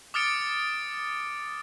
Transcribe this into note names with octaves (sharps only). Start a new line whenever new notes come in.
D6 D#6 F6 A6 C#7 D7